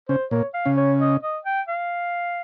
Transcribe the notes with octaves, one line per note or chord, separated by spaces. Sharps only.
C#3 C#4 C5
A#2 A#3 C#5
F5
C#3 C#4
C#5
D#5
D#5
G5
F5